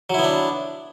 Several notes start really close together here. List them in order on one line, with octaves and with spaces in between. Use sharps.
F#3 E4 B3 D4